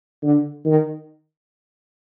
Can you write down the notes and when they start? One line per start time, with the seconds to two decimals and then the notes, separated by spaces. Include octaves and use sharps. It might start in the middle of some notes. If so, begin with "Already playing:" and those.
0.23 D3
0.66 D#3